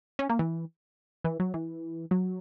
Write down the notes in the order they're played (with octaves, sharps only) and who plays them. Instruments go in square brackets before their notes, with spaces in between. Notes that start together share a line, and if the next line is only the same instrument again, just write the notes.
[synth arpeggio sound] C#4
A#3
E3
E3
F#3
E3
F#3